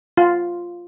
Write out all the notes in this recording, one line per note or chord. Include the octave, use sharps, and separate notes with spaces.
F4